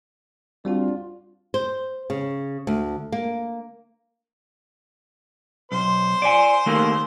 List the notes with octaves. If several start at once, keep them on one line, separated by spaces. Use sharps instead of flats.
G3 C4 D4 F4 F#4
C5
C#3
D2
A#3
B1 C5
D5 G#5
D#3 A3 A#3